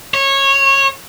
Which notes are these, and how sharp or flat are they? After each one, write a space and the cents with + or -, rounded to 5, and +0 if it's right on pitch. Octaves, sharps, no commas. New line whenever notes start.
C#5 -20